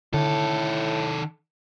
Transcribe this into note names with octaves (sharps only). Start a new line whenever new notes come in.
A2 D3 D#3 A4